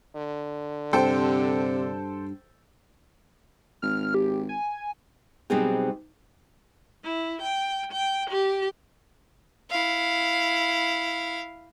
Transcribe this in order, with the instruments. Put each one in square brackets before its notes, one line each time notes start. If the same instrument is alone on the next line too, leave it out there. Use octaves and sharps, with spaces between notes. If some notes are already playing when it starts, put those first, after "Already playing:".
[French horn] D3
[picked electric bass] G2 [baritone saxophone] C3 [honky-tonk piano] A4 C5 G5
[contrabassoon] G#1 [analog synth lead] F6
[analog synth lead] G4
G#5
[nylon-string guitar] B2 F#3 G3 C4 D#4 G#4
[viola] E4
G5
G5
G4
[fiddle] E4 F5